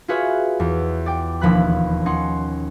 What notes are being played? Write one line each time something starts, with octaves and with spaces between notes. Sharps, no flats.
F4 F#4 G#4 B4 C#5 E5
E2
D5 G5
E1 D#2 F3 B5 F#6
C#4 D#4 F#5 C6